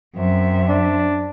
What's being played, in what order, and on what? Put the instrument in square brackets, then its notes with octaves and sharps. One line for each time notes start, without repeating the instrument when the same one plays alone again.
[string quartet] F#2 C4 E5
[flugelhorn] D4